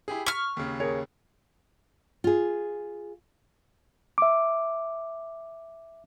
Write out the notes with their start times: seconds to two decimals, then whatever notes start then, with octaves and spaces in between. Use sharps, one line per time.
0.08 E4 G4 G#4
0.26 C#6 F6 B6
0.57 D#2 C#3
0.80 G#4 A#4 C#5
2.24 F4 G#4
4.18 E5 D6